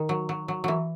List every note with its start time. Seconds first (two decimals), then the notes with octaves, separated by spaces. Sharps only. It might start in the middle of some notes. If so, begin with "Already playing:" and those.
Already playing: D#3
0.09 F#3
0.29 F#3
0.48 F#3
0.64 E3 F#3